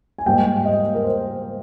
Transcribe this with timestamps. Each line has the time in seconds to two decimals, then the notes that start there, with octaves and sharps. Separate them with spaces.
0.18 G#5
0.26 G#2 G3 A#3 G5
0.65 D#5
0.95 A#4
1.04 C5